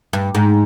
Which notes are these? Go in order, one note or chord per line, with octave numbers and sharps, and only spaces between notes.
G2
G#2